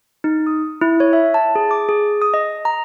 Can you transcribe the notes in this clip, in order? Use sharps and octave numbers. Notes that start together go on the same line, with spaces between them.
D#4
D#6
E4
C#5
E5
A5
G#4
D6
G#4
D#6
D#5
A#5